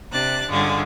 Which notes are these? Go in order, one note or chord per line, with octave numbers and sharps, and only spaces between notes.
C3 D4 F#6 A6
G2 D3 G#3 C#4 F4